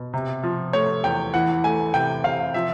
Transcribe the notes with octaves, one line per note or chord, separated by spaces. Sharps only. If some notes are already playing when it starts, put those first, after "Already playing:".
Already playing: B2
C3
F3
A3 C#5
E2 G5
E3 F#5
A3 G#5
C3 G5
C3 F5
F3 E5